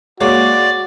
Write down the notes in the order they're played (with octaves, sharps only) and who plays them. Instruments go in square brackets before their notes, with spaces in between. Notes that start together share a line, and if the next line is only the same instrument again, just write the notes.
[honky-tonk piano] G#3 A#3 C#5 [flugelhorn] F#4 [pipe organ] D5 D6